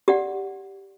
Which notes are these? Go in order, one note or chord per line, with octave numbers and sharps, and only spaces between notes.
G4 D5 F#5